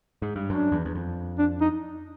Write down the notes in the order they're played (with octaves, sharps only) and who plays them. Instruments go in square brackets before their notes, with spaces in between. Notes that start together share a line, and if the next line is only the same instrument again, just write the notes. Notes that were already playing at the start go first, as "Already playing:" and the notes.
[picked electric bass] G#2
G2
[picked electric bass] F#2 [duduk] D4
[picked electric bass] E2
E2
F2
[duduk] D4
D#4